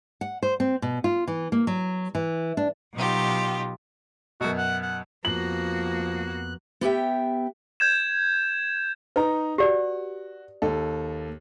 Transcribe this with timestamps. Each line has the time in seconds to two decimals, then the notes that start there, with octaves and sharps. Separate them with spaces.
0.21 F#5
0.43 C5
0.60 C4
0.82 B2
1.04 F4
1.27 E3
1.52 A#3
1.67 F#3
2.15 E3
2.57 D4
2.94 B2 F#3 D#4 F4 G4
4.41 F#2 B2 F#4
4.58 F#5
4.83 F#5
5.25 F2 F3 A#3 B3 F#4 F#6 F#7
6.81 B3 G4 E5 G5
7.80 G6 G#6 E7
9.16 D#4 B4 A#5
9.58 F#4 G4 D5
10.62 D#2 A4